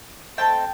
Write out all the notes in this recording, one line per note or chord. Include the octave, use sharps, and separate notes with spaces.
A3 C4 D#4 G5 A5